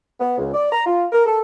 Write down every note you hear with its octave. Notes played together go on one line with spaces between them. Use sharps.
B3
C#2
D5
A#5
F4
A#4
A4